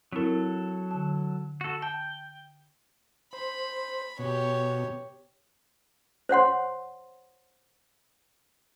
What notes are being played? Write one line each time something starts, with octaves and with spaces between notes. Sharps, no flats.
F#3 C4 E4 A4 A#4
D3 A5
F#4 A4
G5 A5
C5 B5
B2 G4 C#5
C5 C#5 F#5 C6